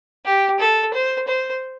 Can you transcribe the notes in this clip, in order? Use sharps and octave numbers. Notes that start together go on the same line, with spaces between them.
G4
A4
C5
C5